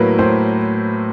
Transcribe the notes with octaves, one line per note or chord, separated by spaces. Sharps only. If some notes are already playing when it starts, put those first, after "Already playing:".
Already playing: A2 F#3 A#3 E4 A#4 B4
A2 C5